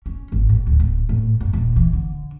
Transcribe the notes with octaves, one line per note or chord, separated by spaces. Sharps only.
C#4
G#1
A2
D2
D1
A2
F#2
D#1
E3
D3